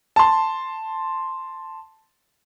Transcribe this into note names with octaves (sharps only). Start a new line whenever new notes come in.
A5 C6